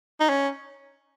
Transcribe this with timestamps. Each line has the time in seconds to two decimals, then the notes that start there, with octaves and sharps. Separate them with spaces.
0.20 D#4
0.29 C#4